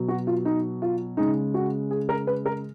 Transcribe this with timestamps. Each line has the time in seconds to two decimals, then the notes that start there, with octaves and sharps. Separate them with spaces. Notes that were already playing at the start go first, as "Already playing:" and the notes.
Already playing: B2 F#3
0.08 F#4
0.27 F4
0.45 D#4
0.82 F4
1.17 C#3 G#3 D#4
1.54 F#4
1.91 G#4
2.09 A#4
2.27 B4
2.46 A#4